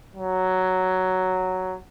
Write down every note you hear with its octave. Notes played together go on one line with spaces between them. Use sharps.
F#3